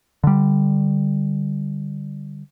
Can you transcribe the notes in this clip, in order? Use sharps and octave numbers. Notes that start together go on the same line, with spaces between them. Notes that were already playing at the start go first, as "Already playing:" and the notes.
D3 G3